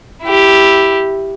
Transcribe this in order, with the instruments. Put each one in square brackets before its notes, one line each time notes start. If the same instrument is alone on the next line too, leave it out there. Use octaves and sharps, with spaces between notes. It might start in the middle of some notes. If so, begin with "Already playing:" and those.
[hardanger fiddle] E4 G4